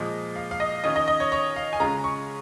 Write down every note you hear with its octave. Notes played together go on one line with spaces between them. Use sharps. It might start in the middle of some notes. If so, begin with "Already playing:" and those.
Already playing: A#2 F3 G#3 D#5
F5
F5
D#5
D#3 C#4 F4 D#5
D#5
D#5
C#5
C#5
F5
G#5
C#3 G#3 C#4 F4 A#5
C#6